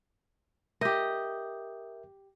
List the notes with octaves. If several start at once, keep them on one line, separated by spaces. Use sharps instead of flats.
G4 A#4 D#5 E5 G6